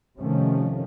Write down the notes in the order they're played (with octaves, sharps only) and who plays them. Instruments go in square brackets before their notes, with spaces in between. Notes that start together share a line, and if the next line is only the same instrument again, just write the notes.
[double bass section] C3 D#3 F3 A3 C#4